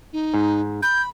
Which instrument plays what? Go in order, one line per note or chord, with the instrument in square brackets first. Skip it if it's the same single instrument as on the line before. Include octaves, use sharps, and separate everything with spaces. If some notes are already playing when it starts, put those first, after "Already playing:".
[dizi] D#4
[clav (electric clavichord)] G#2
[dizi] B5 [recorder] G6